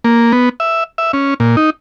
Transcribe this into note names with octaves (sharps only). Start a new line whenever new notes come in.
A#3
B3
E5
E5
C#4
A#2
D#4